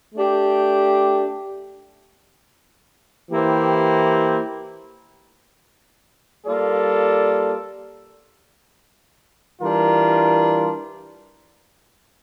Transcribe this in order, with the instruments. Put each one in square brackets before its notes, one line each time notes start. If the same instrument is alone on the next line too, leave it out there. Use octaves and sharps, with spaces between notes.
[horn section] A3 D4 G4
E3 A#3 E4 G4 C5
G3 A#3 F4 A4 D5
E3 G3 D4 F4 A#4